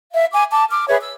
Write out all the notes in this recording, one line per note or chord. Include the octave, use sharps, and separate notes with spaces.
E5 F5
G#5 D6
A5 D6
D6 F6
G#4 B4 C#5 E5
E6